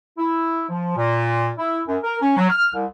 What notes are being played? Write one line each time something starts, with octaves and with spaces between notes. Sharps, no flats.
E4
F3
A#2
E4
F#2
A#4
C#4
F#3
F6
C2